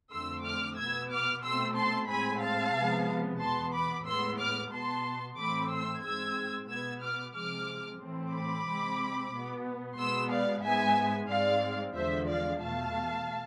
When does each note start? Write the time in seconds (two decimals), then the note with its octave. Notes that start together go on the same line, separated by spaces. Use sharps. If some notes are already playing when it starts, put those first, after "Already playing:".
0.12 F2 D3 A3 C4 C6 E6
0.45 D6 F6
0.78 B2 B3 E6 G#6
1.11 D6 F6
1.44 B2 A3 C4 C6 E6
1.76 A5 C6
2.09 A2 G#3 C4 G#5 B5
2.42 F5 A5
2.75 C3 F3 G#3 B3
3.40 E2 B2 B3 A5 C6
3.74 B5 D6
4.06 A2 G#3 B3 C6 E6
4.39 D6 F6
4.72 B2 B3 A5 C6
5.38 A2 E3 A3 C4 B5 D6
5.70 C6 E6
6.04 G#2 G#3 C4 E6 G#6
6.69 B2 B3 E6 G#6
7.03 D6 F6
7.35 C3 F3 G#3 D6 F6
8.01 A2 E3 A3 C4
8.33 B5 D6
8.67 C3 G#3 C4
9.32 B2 B3
9.98 B2 G#3 B3 C6 E6
10.30 D5 F5
10.63 G#2 G#3 B3 E5 G#5
11.29 G#2 G#3 C4 D5 F5
11.95 E2 D3 F3 G#3 C5 E5
12.28 D5 F5
12.61 E2 B2 A3 F5 A5